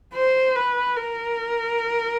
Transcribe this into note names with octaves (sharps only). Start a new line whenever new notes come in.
C5
B4
A#4